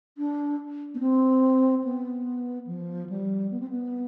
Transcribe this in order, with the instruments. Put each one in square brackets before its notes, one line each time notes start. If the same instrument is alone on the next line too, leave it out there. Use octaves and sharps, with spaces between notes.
[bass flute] D4
B3
C4
B3
F3
G3
B3
C4
B3